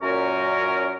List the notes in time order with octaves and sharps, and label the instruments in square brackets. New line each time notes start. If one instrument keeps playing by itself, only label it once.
[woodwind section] F#2 A#2 C#4 A#4